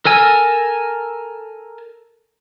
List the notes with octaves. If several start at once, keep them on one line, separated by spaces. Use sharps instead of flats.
A4 A#4 G#5 E6